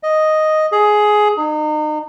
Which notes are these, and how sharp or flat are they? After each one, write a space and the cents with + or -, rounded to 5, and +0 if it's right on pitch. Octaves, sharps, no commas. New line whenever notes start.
D#5 +0
G#4 +15
D#4 -35